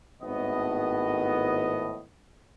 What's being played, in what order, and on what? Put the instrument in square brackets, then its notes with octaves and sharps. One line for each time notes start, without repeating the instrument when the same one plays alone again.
[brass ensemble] G#1 A2 B3 D#5